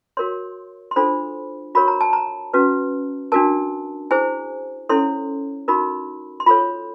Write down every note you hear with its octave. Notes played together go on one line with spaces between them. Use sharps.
F#4 A#4 C#5 C6
C6
D4 F4 A4 C5 B5
F#4 A#4 C#5 B5
A#5
A5
A#5
C#4 F#4 B4
D4 F#4 A#4 A5
E4 G#4 C5 G#5
C#4 E4 A4 C#5 C6
D#4 F#4 A#4 B5
C6
F4 A4 C#5 B5